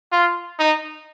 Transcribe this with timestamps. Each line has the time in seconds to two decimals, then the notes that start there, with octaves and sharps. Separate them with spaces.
0.12 F4
0.59 D#4